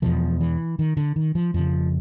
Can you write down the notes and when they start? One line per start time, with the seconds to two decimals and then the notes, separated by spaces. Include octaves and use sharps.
0.02 E2 B2 F3
0.41 E3
0.79 D#3
0.97 D3
1.16 D#3
1.35 F3
1.54 F2 C#3 F3